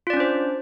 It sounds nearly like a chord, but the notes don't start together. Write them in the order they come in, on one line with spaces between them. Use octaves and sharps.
F4 D5 C#4 D4 C5